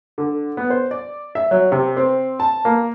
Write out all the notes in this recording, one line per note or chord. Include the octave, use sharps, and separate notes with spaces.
D3
B3
C5
D5
E5
F#3
C3
C4
A5
A#3